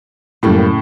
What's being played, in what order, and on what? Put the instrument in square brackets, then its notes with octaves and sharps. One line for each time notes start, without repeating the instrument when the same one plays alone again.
[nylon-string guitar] F#2 G3 A#3 [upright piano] A2 C#3